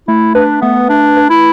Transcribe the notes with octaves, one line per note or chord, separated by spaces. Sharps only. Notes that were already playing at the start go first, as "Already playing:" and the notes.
A3 E4
D4 B4
A3 B3
A3 D4
B4
E4